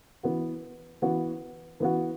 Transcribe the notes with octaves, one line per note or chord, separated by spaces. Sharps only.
E3 B3 F#4
E3 B3 F#4
E3 B3 F#4